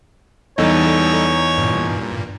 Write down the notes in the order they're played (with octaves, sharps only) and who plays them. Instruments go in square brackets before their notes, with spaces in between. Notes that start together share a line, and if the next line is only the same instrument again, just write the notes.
[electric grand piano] E2 D#4 [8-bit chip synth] G3 A4 D#5 [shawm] C#5
[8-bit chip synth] G2 A#2